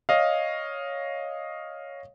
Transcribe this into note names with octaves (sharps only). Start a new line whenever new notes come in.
C#5 D#5 F5